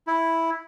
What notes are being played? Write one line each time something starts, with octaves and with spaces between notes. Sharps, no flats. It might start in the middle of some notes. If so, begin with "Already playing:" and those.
E4